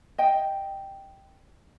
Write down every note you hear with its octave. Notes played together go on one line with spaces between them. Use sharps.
D#5 G5